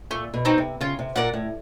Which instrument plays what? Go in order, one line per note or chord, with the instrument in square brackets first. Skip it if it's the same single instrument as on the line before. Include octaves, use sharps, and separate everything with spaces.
[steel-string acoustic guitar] A#2 [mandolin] A3
[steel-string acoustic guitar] B2
[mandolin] C4 D#4 F#4
[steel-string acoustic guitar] C3
[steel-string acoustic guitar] C#3 [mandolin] F4
[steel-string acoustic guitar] C3
[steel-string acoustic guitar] A#2 [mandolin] A#4 D5 F#5
[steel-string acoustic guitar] A2